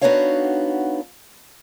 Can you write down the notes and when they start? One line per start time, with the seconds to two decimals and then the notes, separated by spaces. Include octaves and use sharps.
0.01 B3 D4 D#4 F#4 C#5 F5